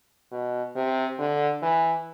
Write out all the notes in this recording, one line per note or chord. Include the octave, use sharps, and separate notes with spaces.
B2
C3
D3
E3